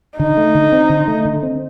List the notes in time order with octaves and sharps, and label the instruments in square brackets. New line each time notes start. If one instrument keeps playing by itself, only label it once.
[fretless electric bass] D3 [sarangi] D#4
[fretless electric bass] A3
D3
C4
D3
A3
D3
C4